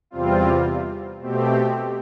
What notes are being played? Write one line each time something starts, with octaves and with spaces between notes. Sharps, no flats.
E2 C3 G3 C4 F4
B2 A3 C4 G4